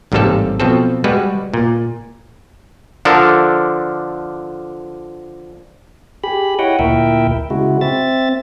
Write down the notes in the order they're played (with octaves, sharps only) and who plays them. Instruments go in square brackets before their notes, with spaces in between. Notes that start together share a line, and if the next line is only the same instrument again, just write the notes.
[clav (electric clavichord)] A1 G#2 C3 G3 A#3 A4
B2 F3 C4 A4
G3 G#3 F#4 B4
A#2
D3 F3 D4 A4 A#4
[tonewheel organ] G4 G#4 B5
E4 C#5 D#5 F#5 G5
D2 A#2 E4 A#4 E5 G5
C#3 G#3 E4 F#4
C4 E5 A6